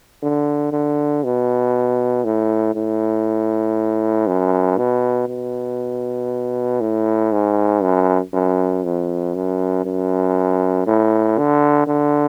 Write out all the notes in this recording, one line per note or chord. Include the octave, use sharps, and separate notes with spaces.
D3
D3
B2
A2
A2
F#2
B2
B2
A2
G#2
F#2
F#2
F2
F#2
F#2
A2
D3
D3